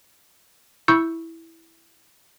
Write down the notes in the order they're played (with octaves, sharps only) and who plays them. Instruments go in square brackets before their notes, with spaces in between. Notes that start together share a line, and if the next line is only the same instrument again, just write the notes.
[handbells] E4 C#6 E6 G6 C#7